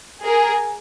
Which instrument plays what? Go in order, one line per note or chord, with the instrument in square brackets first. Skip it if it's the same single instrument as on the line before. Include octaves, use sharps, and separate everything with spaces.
[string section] G#4 A#4